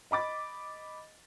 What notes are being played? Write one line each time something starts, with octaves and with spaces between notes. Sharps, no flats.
D#5 B5 D6 A6